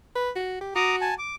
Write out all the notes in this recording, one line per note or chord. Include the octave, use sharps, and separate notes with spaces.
B4
F#4
G4
F#4 A#5 D6 D#6
G#5 A5
D6